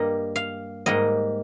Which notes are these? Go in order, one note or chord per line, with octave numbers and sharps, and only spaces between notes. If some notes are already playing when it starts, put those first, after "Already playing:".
Already playing: G2 G3 A#3 D#5
F5
G#2 G3 A#3 D#5